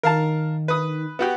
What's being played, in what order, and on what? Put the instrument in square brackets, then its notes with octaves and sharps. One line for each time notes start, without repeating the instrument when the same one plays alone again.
[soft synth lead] D#3 [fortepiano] A#4 F5 A5
[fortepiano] B4 D#6
[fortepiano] B3 F#4 G4 [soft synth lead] F#5